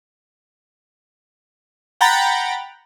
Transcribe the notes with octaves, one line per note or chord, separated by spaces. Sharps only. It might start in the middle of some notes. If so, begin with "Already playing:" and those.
F#5 G5 A#5 B5 A6